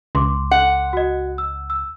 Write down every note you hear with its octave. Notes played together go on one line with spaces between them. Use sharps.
C#2 C6 D6
F#5
F#4 D#5
E6
E6